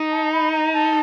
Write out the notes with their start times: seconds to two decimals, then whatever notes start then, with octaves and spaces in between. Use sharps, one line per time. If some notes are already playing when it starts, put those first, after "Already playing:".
Already playing: D#4
0.11 A5
0.33 B5
0.53 A#5
0.73 A5